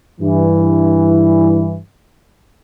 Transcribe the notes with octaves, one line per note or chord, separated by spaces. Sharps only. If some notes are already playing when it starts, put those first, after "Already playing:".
G2 E3